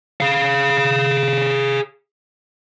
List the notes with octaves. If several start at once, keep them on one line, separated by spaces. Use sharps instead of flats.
G#4 F5